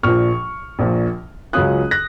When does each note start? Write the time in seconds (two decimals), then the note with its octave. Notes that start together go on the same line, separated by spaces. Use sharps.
0.03 A#1 A#2 F3 C#6 F6
0.79 A#1 A#2 F3
1.53 C#2 C#3 F#3 C#4 F4 D#6 F#6
1.91 F#6 A#6